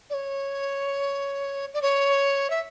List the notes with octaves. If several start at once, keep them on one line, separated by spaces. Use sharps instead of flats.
D5
C#5
D5
C#5
E5